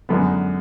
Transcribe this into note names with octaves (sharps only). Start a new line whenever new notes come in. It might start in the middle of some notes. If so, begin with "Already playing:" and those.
F#2 D3 G#3 B3